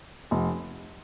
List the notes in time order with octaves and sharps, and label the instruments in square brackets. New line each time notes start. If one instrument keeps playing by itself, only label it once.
[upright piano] F1